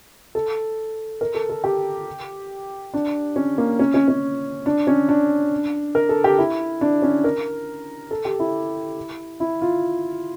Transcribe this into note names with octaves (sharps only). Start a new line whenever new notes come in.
A4
A#4
A4
A4
G4
D4
C#4
A#3
C#4
C#4
C#4
D4
C#4
D4
A#4
A4
G4
E4
D4
C#4
A#4
A4
G4
E4
E4
F4